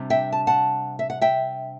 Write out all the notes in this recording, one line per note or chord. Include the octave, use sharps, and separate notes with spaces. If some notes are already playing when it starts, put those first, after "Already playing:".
Already playing: C3 G3 D4
E5 G5
A5
F#5 A5
E5
F#5
E5 G5